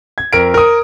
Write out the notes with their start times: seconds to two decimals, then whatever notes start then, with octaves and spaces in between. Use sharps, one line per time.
0.18 G#6
0.33 F2 A#4 D7
0.54 A#4 D#6